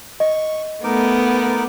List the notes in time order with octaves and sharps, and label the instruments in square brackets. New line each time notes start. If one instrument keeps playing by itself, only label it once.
[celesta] D#5 [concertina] C#6
[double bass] A3 [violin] B3 [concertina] D#4 A#4 D6